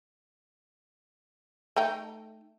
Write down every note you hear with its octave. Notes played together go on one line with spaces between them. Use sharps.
A3 D#4 G5